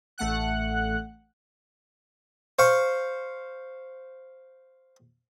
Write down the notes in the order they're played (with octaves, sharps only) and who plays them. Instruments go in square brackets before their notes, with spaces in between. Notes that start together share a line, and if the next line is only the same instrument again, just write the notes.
[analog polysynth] A1 A3 F#5 F#6
[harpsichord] C5 F5 C#6